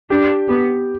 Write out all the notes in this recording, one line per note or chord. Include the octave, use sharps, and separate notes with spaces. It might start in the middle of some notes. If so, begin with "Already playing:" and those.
D4 G4
B3 G4